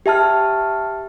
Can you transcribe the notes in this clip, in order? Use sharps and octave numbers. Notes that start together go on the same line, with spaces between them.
G4 E5 A5 F6